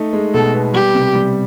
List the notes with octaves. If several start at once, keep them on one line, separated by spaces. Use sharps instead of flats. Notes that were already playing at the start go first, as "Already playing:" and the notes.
Already playing: A3 D#4
G#3
B2 A4
B3
G3 G4
C3
G3